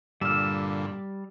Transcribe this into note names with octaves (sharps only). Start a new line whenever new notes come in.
G2 A#2 D3 G3 E6 F6